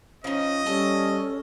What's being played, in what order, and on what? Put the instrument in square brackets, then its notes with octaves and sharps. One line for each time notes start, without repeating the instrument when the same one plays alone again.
[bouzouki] F3 D#4 [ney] C#4 [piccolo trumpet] D#5
[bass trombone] G3 [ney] C#4 [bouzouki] A4